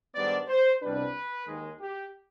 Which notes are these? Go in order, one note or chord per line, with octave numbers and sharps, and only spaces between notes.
G#2 D#3 G3 B3 D4 D5
C5
C2 B2 G3 D4 B4
D#2 D#3 G#3
G4